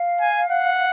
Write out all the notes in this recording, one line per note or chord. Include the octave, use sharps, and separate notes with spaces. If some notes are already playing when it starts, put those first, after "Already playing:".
Already playing: F5
G#5
F#5